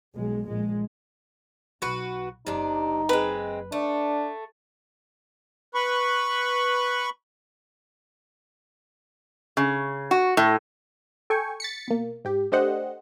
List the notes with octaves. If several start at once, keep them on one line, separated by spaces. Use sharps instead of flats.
B1 G#3
A#1 G#3
B1 F#4 B4
F#1 F#2 C3 D4 D#4
G#3 C4 B4
A3 D4
B4 B5 C#6
C#3
F#4
A2
A4 G5 G#5 C#6
A6 B6 C#7
B2 A#3
G#2 G4
A3 D4 G4 C5 D#5 F#5